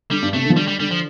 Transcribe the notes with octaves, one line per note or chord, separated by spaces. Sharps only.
D3 G3
G2
C3 A3
D3
F3
D3 G3
G3
D3 G3
F3